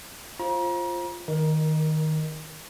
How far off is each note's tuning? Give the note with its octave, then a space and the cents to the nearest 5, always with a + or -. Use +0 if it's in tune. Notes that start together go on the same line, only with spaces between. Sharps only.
F4 +0 C5 +25 A#5 +35
D#3 +0 A#4 +20 D#5 -20